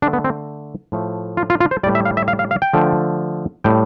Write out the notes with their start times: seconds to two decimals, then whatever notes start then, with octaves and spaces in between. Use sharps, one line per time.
0.02 D3 D4
0.06 A3
0.13 B3
0.24 C4
0.92 A2 F3 A3
1.37 F4
1.50 F4
1.60 F4
1.71 C5
1.83 G3 D5
1.86 A2
1.95 E5
2.05 F5
2.17 E5
2.28 F5
2.39 F5
2.51 F5
2.62 G5
2.73 D3 F3 A3
3.64 A2 G3 G5